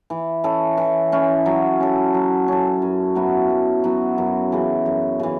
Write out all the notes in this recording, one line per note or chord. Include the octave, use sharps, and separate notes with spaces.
E3
C#4 E4 A4
E3
C#4 E4 A4
F#3
C#4 A4
F#3
C#4 A4
F#2
F#3 B3 E4
F#2
F#3 B3 E4
F#2
C#3 E3
F#2
C#3 E3